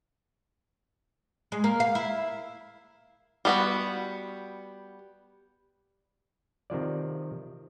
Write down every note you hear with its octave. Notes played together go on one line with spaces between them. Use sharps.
G#3
A#3
F5
E4
G3 B3 F#4
C3 D#3 F3 D5